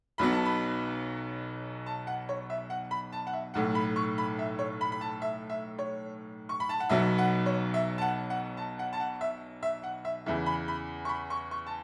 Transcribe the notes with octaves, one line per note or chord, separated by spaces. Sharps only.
B1 B2 F#3 B3 B5
A5
B5
A5
F#5
C#5
E5
F#5
B5
A5
F#5
E5
B1 A2 A3 F#5
B5
C#6
B5
E5
C#5
B5
B5
A5
E5
E5
C#5
C#6
B5
A5
F#5
B1 B2 F#3 B3 E5
F#5
C#5
E5
A5
F#5
F#5
A5
F#5
A5
F#5
E5
E5
F#5
E5
E2 C#3 E3 E5
B5
B5
C#6
B5
C#6
C#6
A5